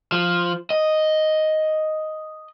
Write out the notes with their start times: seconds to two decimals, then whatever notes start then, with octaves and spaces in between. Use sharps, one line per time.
0.12 F3
0.70 D#5